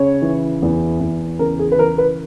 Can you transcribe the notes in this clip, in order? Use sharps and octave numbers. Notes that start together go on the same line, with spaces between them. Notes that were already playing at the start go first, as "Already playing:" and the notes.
Already playing: C#3 C#5
E3
E2
E2
C#3 A#4
G#4
B4
E3 A#4
B4